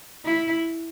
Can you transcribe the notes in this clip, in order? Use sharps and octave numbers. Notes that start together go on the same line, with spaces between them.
E4